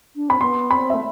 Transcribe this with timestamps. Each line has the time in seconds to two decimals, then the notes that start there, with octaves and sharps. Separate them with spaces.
0.16 D4
0.29 C4 B5
0.41 B3 C6
0.70 C4 B5
0.90 A3 E5